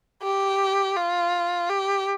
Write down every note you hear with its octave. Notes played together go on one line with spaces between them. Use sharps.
G4
F4
G4